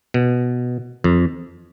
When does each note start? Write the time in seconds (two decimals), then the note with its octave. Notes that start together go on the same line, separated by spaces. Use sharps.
0.14 B2
1.04 F2